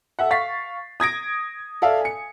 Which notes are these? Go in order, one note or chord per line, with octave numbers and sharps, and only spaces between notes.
A4 E5 F#5
F5 C#6 A6 B6 C7
D#6 G#6 A#6 D7
A4 D5 E5 F5
G#5 C#7